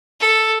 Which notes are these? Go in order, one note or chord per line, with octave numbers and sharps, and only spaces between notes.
A4